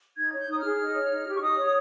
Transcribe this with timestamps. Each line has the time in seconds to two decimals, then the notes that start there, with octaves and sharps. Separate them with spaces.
0.17 D#4 G#6
0.33 C#5
0.38 G6
0.48 D#4 D#6
0.59 F6
0.64 G#4
0.80 D#4
0.95 C#5
1.11 D#4
1.27 G4
1.36 C#6
1.42 D#4 D#6
1.57 C#5
1.65 D#6